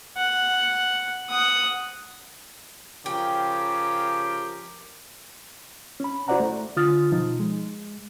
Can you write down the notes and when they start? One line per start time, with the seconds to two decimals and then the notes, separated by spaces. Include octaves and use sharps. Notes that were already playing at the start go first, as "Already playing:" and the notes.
0.17 F#5
1.29 F#5 D#6
3.06 C#3 F3 G4 A#4 G5
6.00 C#4 B5
6.28 E4 F#4 C5 D5 F#5 A#5
6.40 A3
6.76 D3 F4 D#6 F6 A6
7.11 B2 F3 D#4
7.40 G#3